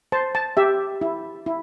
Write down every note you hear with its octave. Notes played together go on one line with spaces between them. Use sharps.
C5 A5
A5
G4 E5
E4
E4